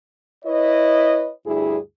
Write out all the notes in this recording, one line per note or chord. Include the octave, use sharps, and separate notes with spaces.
E4 B4 C#5 D#5
D2 G2 E4 G#4